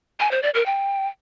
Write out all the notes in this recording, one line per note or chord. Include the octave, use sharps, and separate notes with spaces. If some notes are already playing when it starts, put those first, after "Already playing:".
G#5
C5
D5
A#4
G5